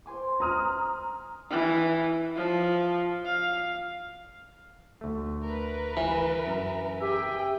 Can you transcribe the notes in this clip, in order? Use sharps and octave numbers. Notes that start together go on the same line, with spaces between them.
C5 G#5 D6
A#5 D#6 F6
E3
F3
F5
D2 A3
A#4 B4
E3
F#2
G4 G#4 E5 G5